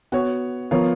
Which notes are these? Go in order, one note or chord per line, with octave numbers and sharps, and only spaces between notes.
B3 F#4 C#5
F3 B3 F4 A#4 C#5